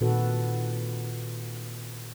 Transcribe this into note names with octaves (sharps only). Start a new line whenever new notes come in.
A#2 D#3 C4 F#4 A4 B4